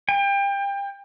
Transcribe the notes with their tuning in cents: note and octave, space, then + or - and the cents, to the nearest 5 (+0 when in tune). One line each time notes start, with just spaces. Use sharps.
G5 +30